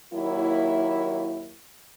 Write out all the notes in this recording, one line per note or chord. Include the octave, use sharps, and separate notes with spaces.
D#2 F#3 A#3 E4